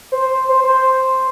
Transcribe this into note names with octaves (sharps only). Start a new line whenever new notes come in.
C5
C5
C5